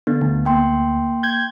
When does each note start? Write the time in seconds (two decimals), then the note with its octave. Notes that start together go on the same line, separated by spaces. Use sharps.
0.07 D3 B3
0.21 D2
0.45 A#3 G5 C6
1.23 G6 G#6